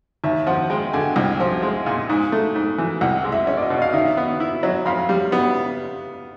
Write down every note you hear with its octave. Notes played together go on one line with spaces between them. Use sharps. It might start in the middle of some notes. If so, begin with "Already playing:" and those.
D#2 E5
F3 F#5
G#3 G5
D3 G#5
C2
F3
G#3
A#2
G#2
A3
G#2
E3
C2 F#5
G#3
E5
C#4
D5
D#5
B2
F5
D#3 E5
B3
E4
F#3
F2 F5
G3
B3